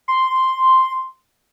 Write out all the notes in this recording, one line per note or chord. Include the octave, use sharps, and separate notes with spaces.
C6